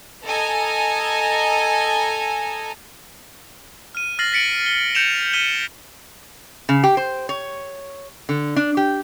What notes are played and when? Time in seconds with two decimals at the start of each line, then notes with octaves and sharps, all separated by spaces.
0.24 A4 D#5 G#5 A#5
3.95 F6 D#7
4.19 F6 A6 A#6 C7 F#7
4.33 A6 B6 C#7 D7 F#7
4.66 G7
4.95 G6 C#7 D7 E7 F7
5.33 F6 G6 B6 D#7 G7
6.69 C#3
6.84 G4
6.97 C5
7.29 C#5
8.29 D3
8.56 D4
8.77 G4